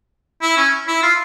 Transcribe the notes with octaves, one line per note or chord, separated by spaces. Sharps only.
E4
C#4
E4
F4